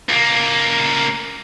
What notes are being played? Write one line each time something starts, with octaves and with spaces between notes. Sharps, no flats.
C#2 A#3